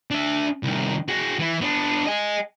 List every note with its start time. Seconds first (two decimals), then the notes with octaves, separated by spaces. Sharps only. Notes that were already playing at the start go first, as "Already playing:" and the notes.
0.11 D4 E5
0.63 C2 D#3
1.08 F#4 G#4
1.39 E3 E4
1.61 B3 D4
2.07 D#5 G#5